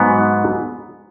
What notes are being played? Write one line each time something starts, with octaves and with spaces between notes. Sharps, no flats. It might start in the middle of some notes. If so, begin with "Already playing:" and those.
Already playing: G#2 F#3 B3